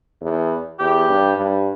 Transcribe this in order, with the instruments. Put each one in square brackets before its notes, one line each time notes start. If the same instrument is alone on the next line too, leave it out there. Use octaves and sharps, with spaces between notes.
[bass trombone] E2
[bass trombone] E2 [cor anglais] G4
[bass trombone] G2
G2